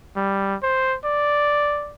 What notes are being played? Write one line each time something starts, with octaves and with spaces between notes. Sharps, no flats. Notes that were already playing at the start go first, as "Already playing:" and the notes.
G3
C5
D5